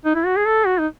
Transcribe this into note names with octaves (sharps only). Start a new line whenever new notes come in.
D#4
E4
F#4
G#4
A4
F#4
D#4